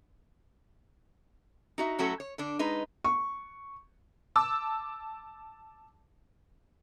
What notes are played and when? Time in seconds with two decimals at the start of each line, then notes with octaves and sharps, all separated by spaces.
1.78 D#4 F#4 E5
1.99 A2 F#3 A3 C#4 F#4 A4
2.20 C#5
2.38 D3 D4
2.59 G#3 D#4 B4
3.04 C#6
4.36 A5 D6 E6